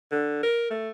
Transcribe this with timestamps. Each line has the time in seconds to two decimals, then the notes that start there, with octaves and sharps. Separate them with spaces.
0.12 D3
0.43 A#4
0.70 A3